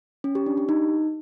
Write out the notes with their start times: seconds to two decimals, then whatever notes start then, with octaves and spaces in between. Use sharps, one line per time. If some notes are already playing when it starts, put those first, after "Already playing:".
0.24 C#4
0.35 G4
0.46 D4
0.58 G4
0.69 D#4